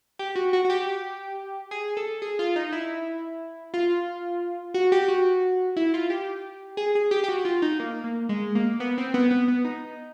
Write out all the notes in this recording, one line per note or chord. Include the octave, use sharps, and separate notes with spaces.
G4
F#4
F#4
F#4
G4
G#4
A4
G#4
F4
D#4
E4
F4
F#4
G4
F#4
E4
F4
G4
G#4
G#4
G4
G4
F#4
F4
D#4
A#3
A#3
G#3
A#3
B3
C4
B3
B3
B3
D#4